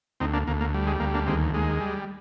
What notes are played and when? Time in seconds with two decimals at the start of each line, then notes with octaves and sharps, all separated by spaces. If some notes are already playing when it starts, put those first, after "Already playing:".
0.20 D2 C4 D#4
0.33 A#3 D4
0.47 D2 A#3
0.61 A#3
0.74 G3
0.87 G#3
1.00 D2 A#3
1.14 A#3 D4
1.27 D#2 G#3 C4
1.54 D#2 G#3
1.80 G3